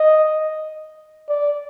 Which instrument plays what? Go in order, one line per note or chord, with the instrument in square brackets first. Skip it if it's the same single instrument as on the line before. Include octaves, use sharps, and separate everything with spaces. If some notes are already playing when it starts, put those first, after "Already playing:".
Already playing: [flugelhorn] D#5
D5